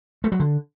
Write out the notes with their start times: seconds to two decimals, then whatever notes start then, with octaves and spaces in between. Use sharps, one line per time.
0.24 A3
0.32 F#3
0.40 D3